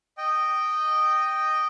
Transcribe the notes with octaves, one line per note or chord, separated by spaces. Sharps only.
D#5 G5